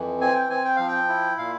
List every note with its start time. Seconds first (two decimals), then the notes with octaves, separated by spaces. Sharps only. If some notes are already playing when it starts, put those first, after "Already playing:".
Already playing: F2 E3
0.20 C4 G#5
0.35 G5
0.50 C4 G#5
0.65 G5
0.76 F3 F5
0.88 G5
1.09 E4
1.38 A#2 F5